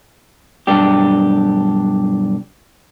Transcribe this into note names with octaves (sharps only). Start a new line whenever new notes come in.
B1 G2 D4 G4